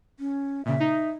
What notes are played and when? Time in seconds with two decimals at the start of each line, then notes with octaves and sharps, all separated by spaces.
0.20 C#4
0.65 A#2 C#3 E5
0.80 D#4